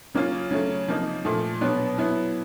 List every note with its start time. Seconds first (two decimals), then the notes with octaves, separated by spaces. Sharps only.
0.14 C#3 F#3 A#3 C#4 F4
0.51 C#3 F#3 A3
0.88 C3 F3 A#3 D#4
1.25 A#2 F3 A3
1.61 B2 F#3 B3 D4
1.98 F#3 B3 E4